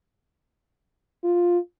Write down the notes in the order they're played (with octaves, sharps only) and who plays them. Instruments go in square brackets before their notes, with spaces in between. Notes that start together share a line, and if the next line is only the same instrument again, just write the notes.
[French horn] F4